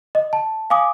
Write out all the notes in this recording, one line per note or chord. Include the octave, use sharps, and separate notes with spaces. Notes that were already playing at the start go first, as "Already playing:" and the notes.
D#5
A5
F5 G#5 D6 D#6